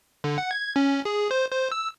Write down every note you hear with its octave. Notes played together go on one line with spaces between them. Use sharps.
D3
F#5
G#6
C#4
G#4
C5
C5
E6